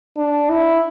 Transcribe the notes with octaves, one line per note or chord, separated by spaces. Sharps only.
D4
E4